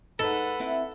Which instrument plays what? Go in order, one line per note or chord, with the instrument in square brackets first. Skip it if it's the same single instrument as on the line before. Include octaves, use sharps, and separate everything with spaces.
[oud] G#3 D#4 [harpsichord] A4 [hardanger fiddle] B4 F#5
[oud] C4 E4